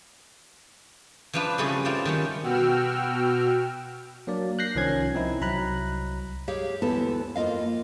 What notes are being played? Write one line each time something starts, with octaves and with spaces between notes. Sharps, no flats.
E3 F3 D4 F4 B4
C#3 G3 A3 C4 G#4 B4
E4 F4 C5 D5
D#3 G3 C#4
B2 F#4 G5 E6 F6
F#3 A#3 D4 D5
F#6 G6 A#6 C7
C2 D#3 F3 C#4 G#6
C4 D#4 E4
C2 F#3 A#5 B5 F#6
G4 G#4 C#5 F5
D2 E3 B3 A4 A5
F2 A#3 F4 D#5 F5